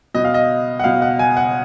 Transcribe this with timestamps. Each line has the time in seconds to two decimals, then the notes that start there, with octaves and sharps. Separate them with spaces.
0.14 B2 D#5
0.25 F5
0.34 D#5
0.80 F#5
0.84 B2 F5
1.02 F#5
1.19 G#5
1.37 F#5